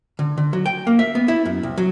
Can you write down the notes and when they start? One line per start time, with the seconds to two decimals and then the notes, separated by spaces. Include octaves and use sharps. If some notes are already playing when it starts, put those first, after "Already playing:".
0.19 D3
0.38 D3
0.53 F#3
0.66 G5
0.87 A#3
0.99 E5
1.15 B3
1.28 E4
1.45 F#2
1.63 C2
1.78 F#3